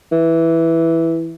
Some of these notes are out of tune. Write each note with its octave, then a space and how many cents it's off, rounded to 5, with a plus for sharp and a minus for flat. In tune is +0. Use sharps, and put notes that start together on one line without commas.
E3 +0